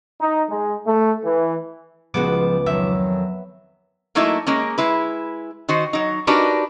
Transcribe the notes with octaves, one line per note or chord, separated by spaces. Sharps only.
D#4
G#3
A3
E3
C#2 F3 G#3 B3 F#4 D6
F2 D#3 F#3 E5
F#3 A3 A#3 D#4 E4
G#3 A#3 C#4
G#3 E4 B4
D#3 D#4 F#4 C5
F#3 D#4
D4 D#4 F#4 G4 A#4 B4